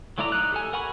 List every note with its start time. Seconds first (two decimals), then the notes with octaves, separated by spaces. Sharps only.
0.18 F#3 A3 E4 D5 A#5
0.32 D#4 F#6
0.52 G4 A4 G#5
0.73 A#4 F#5 G#5 B5 C#6